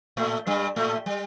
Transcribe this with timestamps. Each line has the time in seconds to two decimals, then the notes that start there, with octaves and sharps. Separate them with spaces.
0.17 A2 A3
0.47 G2 G3
0.76 A2 A3
1.06 G3